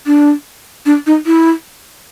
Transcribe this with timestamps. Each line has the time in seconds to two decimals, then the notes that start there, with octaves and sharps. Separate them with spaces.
0.06 D4
0.86 D4
1.07 D#4
1.26 E4